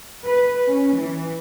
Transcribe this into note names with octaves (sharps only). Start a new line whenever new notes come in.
B4
C#4
E3